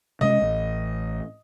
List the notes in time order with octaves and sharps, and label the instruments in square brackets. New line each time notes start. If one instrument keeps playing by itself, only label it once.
[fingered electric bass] C3 G#3 C#4 [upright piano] D#5
[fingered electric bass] A1